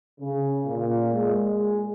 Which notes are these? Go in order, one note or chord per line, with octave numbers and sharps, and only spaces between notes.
C#3
A#2
G#3